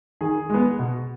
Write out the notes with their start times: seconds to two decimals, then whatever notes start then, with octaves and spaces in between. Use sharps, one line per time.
0.21 D#3 G#4
0.50 G#3 B3
0.79 B2